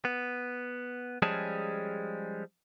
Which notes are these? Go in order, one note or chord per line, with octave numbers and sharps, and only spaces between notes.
B3
F3 G3 G#3 C#4 G#4 A5